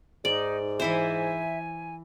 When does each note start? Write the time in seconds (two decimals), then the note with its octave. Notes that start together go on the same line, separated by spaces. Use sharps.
0.25 G#2 D#4 D5
0.80 E3 E4 C5 E5 G#5